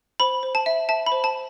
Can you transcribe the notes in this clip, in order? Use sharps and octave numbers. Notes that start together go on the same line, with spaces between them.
C5 B5
C5
A5
E5
E5 A5
B5
C5
A5